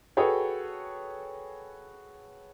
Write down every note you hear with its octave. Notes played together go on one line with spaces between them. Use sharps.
F#4 G#4 A4 B4 C#5 G5